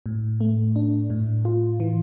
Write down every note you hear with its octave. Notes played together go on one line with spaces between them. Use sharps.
A2
A3
D4
A2
F4
E3